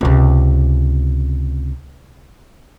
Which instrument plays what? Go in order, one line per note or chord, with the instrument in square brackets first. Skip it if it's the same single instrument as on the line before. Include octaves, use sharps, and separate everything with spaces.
[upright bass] C#2 C3